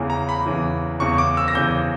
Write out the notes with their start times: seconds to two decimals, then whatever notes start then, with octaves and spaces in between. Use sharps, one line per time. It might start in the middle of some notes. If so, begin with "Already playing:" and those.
Already playing: E2 C#3 E3
0.10 A#5
0.29 B5
0.46 E2 C#3 E3
1.00 E2 C#3 E3 C#6
1.18 D6
1.37 E6
1.48 A#6
1.55 E2 C#3 E3 G6